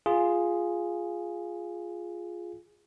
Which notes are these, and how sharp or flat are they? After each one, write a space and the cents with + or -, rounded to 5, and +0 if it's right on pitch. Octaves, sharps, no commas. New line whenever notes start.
F4 +0 G#4 +0